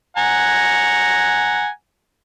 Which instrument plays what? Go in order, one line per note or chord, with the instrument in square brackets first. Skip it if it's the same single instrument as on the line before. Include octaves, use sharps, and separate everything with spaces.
[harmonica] F#5 G#5 A#5